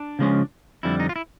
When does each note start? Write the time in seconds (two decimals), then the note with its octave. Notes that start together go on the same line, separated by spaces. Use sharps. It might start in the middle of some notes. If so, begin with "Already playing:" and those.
Already playing: D4
0.19 C#3 F3 G#3 C#4
0.83 F2 D3 G3 E4
1.00 D#4
1.09 F4
1.16 E4